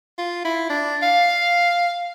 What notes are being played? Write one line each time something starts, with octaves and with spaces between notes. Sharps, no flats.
F4
E4
D4
F5